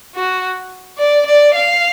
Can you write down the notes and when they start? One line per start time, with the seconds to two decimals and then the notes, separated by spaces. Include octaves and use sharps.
0.15 F#4
0.99 D5
1.26 D5
1.55 F5